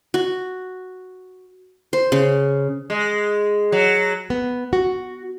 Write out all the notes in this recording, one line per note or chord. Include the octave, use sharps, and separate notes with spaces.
F#4
C5
C#3
G#3
F#3
B3
F#4